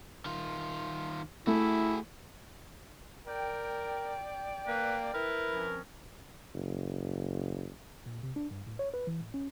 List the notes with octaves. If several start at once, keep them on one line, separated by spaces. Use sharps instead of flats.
D#3 F4
A3 E4 F#4 G#4
A#4 D5 G5
A#3 B4
E4 A#4 B4
F3 C4 C#4
F#1
A#2
C3
D4
G2
A2
C#5
B4
E3
A2
C#4